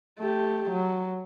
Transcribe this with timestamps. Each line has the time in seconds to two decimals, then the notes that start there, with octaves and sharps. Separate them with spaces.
0.19 A3 G4
0.71 F#3